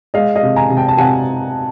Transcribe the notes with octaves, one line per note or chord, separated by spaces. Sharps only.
G#3 D#5 F5
D#5 F5
C3
G#5 A#5
C3
G5 A5
A5
C3 F#5 G#5